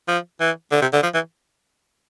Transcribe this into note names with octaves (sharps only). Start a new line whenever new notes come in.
F3
E3
D3
C3
D3
F3
E3